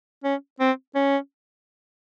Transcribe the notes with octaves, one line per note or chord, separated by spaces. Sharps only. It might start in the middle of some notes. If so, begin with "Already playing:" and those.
C#4
C4
C#4